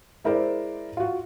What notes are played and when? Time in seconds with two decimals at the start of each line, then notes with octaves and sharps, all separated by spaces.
0.24 G#3 E4 A#4 C5 D5
0.97 F4 F#4